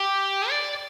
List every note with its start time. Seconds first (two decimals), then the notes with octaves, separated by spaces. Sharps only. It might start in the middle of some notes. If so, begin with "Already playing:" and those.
Already playing: G4
0.50 D5